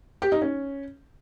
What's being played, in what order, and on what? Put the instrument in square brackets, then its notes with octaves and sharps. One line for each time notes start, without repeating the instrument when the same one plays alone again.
[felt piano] G4
D#4
C#4